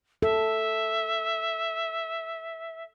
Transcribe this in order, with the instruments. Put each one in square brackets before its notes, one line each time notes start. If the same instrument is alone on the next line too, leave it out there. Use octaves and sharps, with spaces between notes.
[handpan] A4 [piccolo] E5